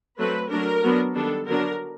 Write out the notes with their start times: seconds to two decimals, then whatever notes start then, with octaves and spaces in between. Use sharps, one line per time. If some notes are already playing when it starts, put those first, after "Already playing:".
0.19 F#3 A3 C4 B4
0.51 F#3 A3 D4 A#4
0.83 F#3 B3 D4
1.15 D#3 G3 B3 D4 A4
1.47 D3 F#3 B3 D4 A#4